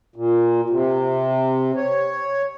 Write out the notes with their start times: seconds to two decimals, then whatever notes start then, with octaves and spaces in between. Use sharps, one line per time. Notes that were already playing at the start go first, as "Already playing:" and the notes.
0.16 A#2
0.70 C3
1.77 C#5